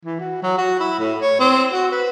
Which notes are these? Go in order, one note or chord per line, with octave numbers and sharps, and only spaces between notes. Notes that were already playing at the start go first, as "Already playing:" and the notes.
E3
F#4
F#3
F#4
E4
A2
C#5
C4
F#4
B4